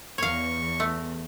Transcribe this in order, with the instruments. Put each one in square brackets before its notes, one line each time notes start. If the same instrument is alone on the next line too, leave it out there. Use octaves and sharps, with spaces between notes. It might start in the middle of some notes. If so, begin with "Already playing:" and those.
[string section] E2 [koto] C#5 F5 [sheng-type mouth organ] C#6
[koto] A3